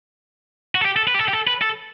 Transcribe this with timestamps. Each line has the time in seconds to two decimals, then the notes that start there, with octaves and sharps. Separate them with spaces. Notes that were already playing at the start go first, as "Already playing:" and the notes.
0.75 F#4
0.81 A4
0.85 G4
0.96 A4
1.08 B4
1.14 G4
1.19 A4
1.28 G4
1.33 A4
1.47 B4
1.62 A4